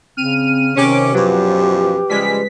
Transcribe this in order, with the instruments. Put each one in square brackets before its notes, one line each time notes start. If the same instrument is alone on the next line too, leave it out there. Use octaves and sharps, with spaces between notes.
[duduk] C#3 [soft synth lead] C4 [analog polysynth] F6 D#7
[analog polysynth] C3 D6 [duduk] D#3 [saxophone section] C#4 [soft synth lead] C#5
[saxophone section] F#2 B2 F3 [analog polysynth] F#3 [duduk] G4 [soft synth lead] B4
[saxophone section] C#3 F3 G3 [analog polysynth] G#3 B6